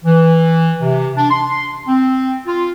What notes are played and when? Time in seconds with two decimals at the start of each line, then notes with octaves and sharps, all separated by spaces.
0.04 E3
0.82 C3
1.16 D4
1.30 C6
1.87 C4
2.46 F4